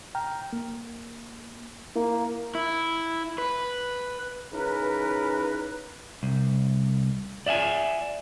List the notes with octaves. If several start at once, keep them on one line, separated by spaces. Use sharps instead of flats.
G5 A#5 F6
A#3
A#3 E4 A#4
E4
B4
C#3 E3 C#4 D#4 A#4 B4
C2
D5 E5 F#5 G#5